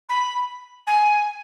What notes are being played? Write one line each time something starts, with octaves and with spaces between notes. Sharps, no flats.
B5
G#5